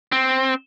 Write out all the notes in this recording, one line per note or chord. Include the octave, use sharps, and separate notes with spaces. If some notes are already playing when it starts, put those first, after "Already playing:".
C4